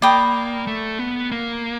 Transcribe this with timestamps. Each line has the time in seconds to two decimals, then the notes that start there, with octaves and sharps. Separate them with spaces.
0.02 A#3 D5 G5 B5 D#6
0.67 A3
0.99 B3
1.32 A#3